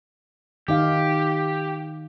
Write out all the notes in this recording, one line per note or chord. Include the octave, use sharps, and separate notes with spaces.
D#3 D#4 G4 F5